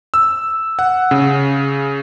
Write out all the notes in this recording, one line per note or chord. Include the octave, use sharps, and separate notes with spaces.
E6
F#5
C#3